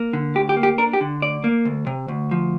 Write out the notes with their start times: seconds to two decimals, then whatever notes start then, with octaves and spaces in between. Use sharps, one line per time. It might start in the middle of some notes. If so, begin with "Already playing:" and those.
Already playing: A#3
0.13 D3
0.35 D2 G4
0.49 G4
0.56 A#3
0.63 G4
0.78 D4 A#4
0.93 G4
1.01 D3
1.22 D2 D5
1.44 A#3
1.65 D2
1.87 C3
2.08 D2
2.31 F3